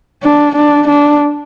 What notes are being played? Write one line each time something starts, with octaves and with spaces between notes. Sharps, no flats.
D4
D4
D4